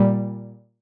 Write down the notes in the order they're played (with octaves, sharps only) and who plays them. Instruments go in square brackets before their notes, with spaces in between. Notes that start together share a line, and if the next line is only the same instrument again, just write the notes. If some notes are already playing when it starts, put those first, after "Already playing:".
Already playing: [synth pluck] A#2 G3